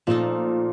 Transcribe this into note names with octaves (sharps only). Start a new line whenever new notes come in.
A#2 F3 A3 D#4 A4